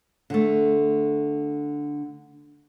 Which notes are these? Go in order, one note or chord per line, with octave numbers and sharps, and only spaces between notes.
D3 A3